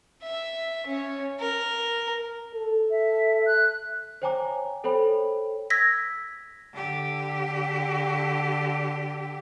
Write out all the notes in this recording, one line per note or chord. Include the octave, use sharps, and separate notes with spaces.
E5
C#4
A#4
A4
E5
F#6
C5 C#5 G5 G#5 A#5 D6
A4 C5 C#5 G5 B5
E6 G#6 A#6 B6
D3 G4